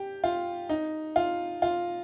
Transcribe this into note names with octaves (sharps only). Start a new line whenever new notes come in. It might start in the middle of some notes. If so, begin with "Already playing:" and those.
Already playing: G4
F4
D#4
F4
F4